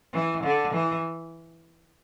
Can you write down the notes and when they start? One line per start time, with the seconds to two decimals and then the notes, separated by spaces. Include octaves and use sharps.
0.13 E3
0.44 D3
0.74 E3